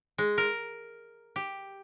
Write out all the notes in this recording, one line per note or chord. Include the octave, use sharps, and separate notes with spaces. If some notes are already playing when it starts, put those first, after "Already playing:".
G#3
A#4
G4